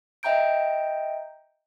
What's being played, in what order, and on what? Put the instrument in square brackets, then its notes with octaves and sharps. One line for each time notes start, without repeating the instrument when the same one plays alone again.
[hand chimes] D#5 E5 G5 A#5 G6 D7